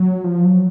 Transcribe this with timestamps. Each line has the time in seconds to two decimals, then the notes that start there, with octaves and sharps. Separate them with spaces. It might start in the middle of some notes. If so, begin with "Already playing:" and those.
Already playing: F#3
0.24 F3
0.45 F#3